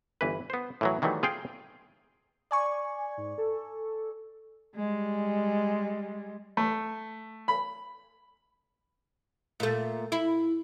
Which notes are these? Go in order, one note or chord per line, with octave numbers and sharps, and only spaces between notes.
G1 E3 B4
B3 C5
A2 E3 F#3
D#3 E3 F#3 G3 A3
F4 G#4 F5 G5
D5 G#5 C#6
G#2
A4
G3 G#3
A3
B5
A#2 A3
E4